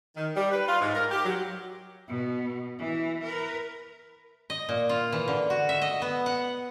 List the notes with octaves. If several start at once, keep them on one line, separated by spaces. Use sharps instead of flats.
D#3
G3
B4
F4
G#2
A#4
G4
F#3
B2
E3
A#4 B4
D#5
A#2
F4
E3
D3
F#4
E5
D#5
B3
F#5